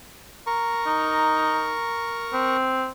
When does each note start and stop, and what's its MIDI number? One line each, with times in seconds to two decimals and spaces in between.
0.47 2.57 70
0.47 2.57 82
0.47 2.57 85
0.87 1.76 63
2.33 2.89 60